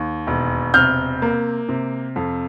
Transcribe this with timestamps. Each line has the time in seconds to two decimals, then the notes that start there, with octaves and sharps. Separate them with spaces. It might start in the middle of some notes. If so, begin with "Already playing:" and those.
Already playing: D#2
0.27 E1
0.74 C3 F6 G6
1.22 A#3
1.69 C3
2.16 F2